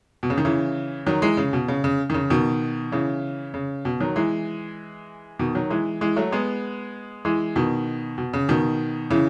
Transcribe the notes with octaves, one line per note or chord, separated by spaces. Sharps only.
B2
C#3
D#3
C#3 E3
D#3 F#3
E3 G#3
C#3
B2
C#3
C#3
D#3
C#3
B2 D#3
C#3 E3
C#3
B2
D#3 F#3
E3 G#3
B2 D#3
D#3 F#3
E3 G#3
E3 G#3
F#3 A3
G#3 B3
E3 G#3
B2 D#3
B2
C#3
B2 D#3
C#3 E3